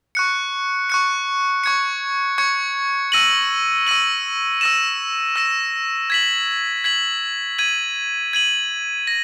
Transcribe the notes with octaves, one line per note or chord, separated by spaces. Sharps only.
C#6 F#6 C#7
C#6 F#6 C#7
C#6 G#6 C#7
C#6 G#6 C#7
E6 A#6 D#7 F#7
E6 A#6 D#7 F#7
E6 A#6 E7
E6 A#6 E7
G#6 B6 F#7
G#6 B6 F#7
G#6 D#7 F#7
G#6 D#7 F#7
A#6